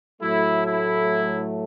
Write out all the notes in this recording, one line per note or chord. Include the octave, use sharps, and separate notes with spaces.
A2 F#3 A3 E4
E4